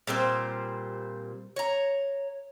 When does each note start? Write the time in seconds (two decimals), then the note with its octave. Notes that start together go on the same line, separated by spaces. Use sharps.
0.07 A#2 G3 C4 C5
1.56 C#5 A#5